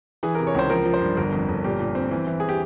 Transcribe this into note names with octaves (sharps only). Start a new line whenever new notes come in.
E3 G#4
A#4
C3
C#5
C#2 C5
F3 A#4
F3
C5
G2
G1 A#4
F2
G1
A#2 G4
A#2
C4
E3
E3
G#4
G4